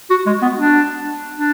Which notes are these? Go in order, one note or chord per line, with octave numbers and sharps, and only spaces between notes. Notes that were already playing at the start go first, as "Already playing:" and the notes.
F#4
G#3
B3
D4
D4